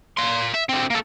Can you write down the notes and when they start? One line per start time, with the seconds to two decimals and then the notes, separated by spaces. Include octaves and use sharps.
0.17 A#3 C6
0.54 E5
0.69 D3 C4
0.90 A#3 A4